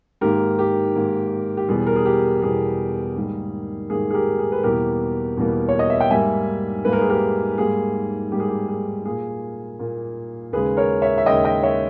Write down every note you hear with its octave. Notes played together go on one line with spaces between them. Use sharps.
G#2 D#3 A#3 G4 A#4
G4
G#2 D#3 A#3
G4
E2 B2 G3 G#4
A#4
G#4
G4
E2 B2 G3 G#4
G#2 D#3 G3 A#3
G#2 D#3 G3 A#3 G#4
G#4
G4 A#4
G#4
B4
E2 B2 G3 A#3 G4 A#4
E2 B2 G3 A#3
C#5
D#5
E5
G5
G#2 G3 A#3 E5 G#5
G#2 G3 A#3 B4
A#4
G#4
G4 A#4
G#2 G3 A#3 G#4
G#2 G3 A#3 G4
G#4
G4
G#4
A#2 A#3 G#4
A#2 A#3
D#2 C#3 G#3 G#4 B4
A#4 C#5
C#5 E5
E5
D#2 C#3 G#3 D#5 G5
D#5 G5
C#5 E5